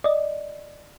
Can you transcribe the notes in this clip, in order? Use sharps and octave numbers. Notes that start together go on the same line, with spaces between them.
D5 D#5